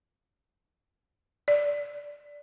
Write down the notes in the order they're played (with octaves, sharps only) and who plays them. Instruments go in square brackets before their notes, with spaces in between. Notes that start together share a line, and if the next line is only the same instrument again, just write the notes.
[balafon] D5